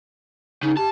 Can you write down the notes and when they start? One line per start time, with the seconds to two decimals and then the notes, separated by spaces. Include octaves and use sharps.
0.63 C#3 D#4
0.77 G4 A5